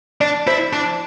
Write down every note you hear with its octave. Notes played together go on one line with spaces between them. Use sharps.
D4 D5
E4 C5
D4